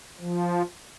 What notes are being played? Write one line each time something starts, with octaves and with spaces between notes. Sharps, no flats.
F3